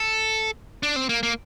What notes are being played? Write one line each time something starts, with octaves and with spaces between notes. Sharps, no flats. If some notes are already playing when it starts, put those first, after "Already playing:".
Already playing: A4
D4
C4
A#3
A#3